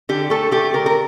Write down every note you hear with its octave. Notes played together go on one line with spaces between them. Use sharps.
D3 G4
A3 A4
A3 G4
D3 A#4
A#4